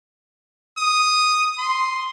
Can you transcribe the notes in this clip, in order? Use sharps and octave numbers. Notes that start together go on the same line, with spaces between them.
D#6
C6